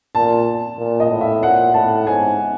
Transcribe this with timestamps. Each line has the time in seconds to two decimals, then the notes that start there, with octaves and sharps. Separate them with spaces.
0.15 A#2 A5
0.78 A#2
1.00 D#5
1.10 A2
1.21 E5
1.42 A#2 F#5
1.74 A2 A5
2.06 G#2 G#5